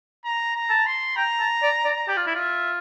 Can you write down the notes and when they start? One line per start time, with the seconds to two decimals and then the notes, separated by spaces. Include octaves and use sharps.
0.25 A#5
0.55 A#5
0.70 A5
0.86 C6
1.16 G5 A#5
1.40 A5
1.62 D5
1.85 D5
2.08 G4 D5
2.17 F4
2.27 E4
2.35 F4 E5